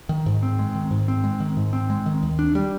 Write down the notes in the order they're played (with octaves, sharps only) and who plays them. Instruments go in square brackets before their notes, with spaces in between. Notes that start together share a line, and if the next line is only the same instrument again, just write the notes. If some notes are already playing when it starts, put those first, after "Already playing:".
[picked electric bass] D#3
G#2
C4
G#3
D#3
G#2
C4
G#3
D#3
G#2
C4
G#3
D#3
D#2
D4
G3